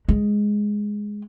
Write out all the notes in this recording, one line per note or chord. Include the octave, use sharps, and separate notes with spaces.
G#3